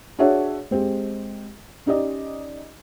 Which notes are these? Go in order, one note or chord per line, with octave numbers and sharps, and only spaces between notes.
D4 F#4 G#4 C#5 E5 F#5
G#3 C4 G4
C#4 D#4 G4 D5 D#5